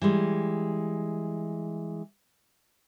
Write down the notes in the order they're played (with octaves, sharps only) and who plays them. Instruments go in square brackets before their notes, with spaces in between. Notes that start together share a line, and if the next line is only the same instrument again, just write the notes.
[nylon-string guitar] E3 G3 G#3